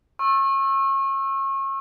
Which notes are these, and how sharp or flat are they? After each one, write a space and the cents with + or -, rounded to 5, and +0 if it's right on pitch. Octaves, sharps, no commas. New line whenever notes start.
C#6 -30 E6 +5